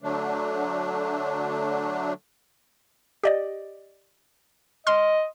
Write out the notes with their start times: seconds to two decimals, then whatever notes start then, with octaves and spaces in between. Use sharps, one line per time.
0.03 D3 F#3 A3 D4
3.23 G4 D5 D#5
4.87 D#5 C6 F6